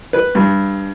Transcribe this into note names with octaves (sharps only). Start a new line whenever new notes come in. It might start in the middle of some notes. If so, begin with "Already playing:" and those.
B4
G2